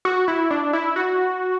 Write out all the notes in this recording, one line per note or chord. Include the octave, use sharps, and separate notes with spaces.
F#4
E4
D4
E4
F#4